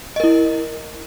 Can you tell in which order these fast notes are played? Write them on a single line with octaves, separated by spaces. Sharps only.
D#5 A#4 E4